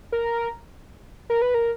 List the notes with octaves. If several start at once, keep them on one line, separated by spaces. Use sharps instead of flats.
A#4
A#4
B4
A#4